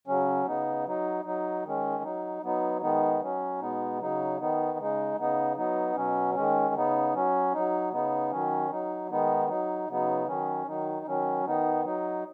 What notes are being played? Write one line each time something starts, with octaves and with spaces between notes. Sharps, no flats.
C#3 F#3 C#4
C#3 B3 D#4
F#3 D#4
F#3 D#4
D#3 G#3 C#4
F#3 D#4
F#3 B3 D#4
D#3 G#3 B3 D#4
F#3 C#4
B2 G#3 B3 D#4
C#3 F#3 D#4
D#3 B3 D#4
C#3 G#3 D#4
C#3 B3 D#4
F#3 B3 D#4
B2 F#3 C#4
D#3 G#3 C#4
C#3 B3 D#4
F#3 C#4
F#3 D#4
C#3 B3 D#4
D#3 F#3 C#4
F#3 D#4
D#3 G#3 B3 D#4
F#3 D#4
C#3 F#3 B3 D#4
D#3 F#3 C#4
D#3 F#3 D#4
D#3 F#3 C#4
D#3 B3 D#4
F#3 D#4